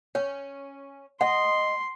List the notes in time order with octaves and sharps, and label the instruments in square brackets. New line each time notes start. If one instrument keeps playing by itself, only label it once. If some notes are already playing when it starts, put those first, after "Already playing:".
[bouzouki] C#4 [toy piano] C#5
[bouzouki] D#5 [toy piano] F#5 [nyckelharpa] C6